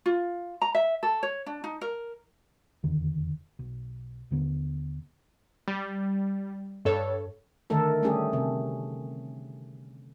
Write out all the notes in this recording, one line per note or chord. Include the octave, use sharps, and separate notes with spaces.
F4
A#5
E5
A4
C#5
D4
D#4
A#4
F1 E2 D3 D#3
B1
D#2 D3 B3
G3
G2 A4 C#5
D3 D#3 A3 A4 A#4
G3 A3 C#4 G4 G#4
C3